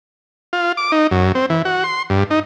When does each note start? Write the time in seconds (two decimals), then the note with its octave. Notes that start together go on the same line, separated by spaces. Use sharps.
0.53 F4
0.77 D6
0.92 D#4
1.11 F#2
1.35 C4
1.50 E3
1.65 F#4
1.84 C6
2.10 G2
2.30 D#4